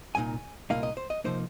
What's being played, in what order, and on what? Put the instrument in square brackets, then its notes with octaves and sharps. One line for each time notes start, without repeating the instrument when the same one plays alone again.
[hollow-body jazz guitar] C2 A#2 A#3 D#4 G#5
C2 A#2 A#3 D#4 F5
D#5
C5
D#5
C3 F3 A#3 D#4 C5